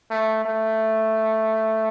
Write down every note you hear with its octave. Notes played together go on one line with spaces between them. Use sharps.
A3
A3